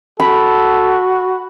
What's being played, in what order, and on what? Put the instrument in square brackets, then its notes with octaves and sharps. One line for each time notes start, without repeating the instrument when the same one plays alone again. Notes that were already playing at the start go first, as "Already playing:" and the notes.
[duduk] F#4 [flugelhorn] A4 [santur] B5